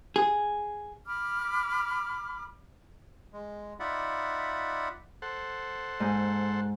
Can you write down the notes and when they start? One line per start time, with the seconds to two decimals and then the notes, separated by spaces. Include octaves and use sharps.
0.16 G#4
1.06 B5 D6 F6
3.33 G#3
3.80 D#4 F4 D5 E5 F#5 B5
5.22 A4 C5 F#5
6.00 G#2